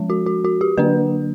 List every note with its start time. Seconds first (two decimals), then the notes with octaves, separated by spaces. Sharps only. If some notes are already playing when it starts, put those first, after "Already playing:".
Already playing: F3 G#3 C#4
0.10 F#4
0.26 F#4
0.45 F#4
0.61 G4
0.78 D3 F#3 A#3 D4 B4